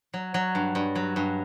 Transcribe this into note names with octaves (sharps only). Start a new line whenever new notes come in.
F#3
F#3
G2
G2
F#3
G2